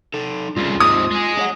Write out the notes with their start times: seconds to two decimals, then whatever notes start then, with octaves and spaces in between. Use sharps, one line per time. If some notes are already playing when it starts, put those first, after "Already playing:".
0.14 D#4 A4
0.56 C2 C#3 F4
0.80 G#2 C3 D#6
1.11 G#3 G#4
1.37 D4 C#5 F#5